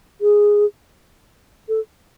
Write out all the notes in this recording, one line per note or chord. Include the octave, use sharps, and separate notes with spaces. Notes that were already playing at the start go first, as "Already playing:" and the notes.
G#4
A4